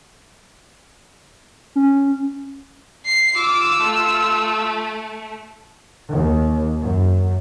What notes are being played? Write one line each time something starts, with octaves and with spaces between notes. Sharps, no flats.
C#4
C7
F4 D6 E6
A3
D#2
F#2